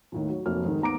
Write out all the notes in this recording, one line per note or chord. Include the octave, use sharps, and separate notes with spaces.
D#2 A2 D#3
F#3
F1 F#3 A#3 F6
G#2 D#3
D#2 B3 A#5 D6 D7